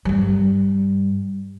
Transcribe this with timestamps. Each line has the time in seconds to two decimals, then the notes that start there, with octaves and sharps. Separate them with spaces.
0.05 G2 G3